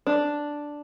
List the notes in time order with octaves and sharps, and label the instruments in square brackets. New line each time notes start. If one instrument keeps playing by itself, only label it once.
[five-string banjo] D4